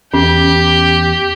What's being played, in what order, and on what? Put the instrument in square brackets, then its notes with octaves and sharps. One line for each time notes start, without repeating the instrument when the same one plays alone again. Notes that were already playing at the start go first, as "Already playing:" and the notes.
[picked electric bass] E2 [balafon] C#4 [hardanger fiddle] G4